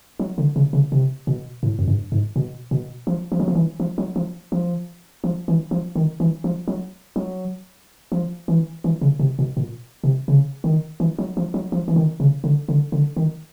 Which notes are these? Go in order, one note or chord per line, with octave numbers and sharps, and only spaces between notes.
F#3
D3
C#3
C#3
C3
B2
A2
F#2
G2
G#2
B2
B2
F3
F3
F#3
F3
E3
F3
F#3
F3
F3
F3
E3
F3
D#3
E3
F3
F#3
F#3
F3
E3
E3
C#3
C3
B2
A#2
C3
C#3
D#3
E3
F#3
F3
F#3
F3
E3
D#3
C#3
D3
D3
D3
D#3